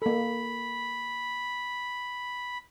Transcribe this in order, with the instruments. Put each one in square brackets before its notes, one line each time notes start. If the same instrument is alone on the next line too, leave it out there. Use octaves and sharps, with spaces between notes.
[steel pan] A#3 A4 [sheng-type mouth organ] B5